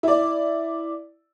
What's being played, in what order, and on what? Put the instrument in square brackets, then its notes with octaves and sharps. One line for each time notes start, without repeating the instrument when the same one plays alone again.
[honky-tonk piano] E4 D5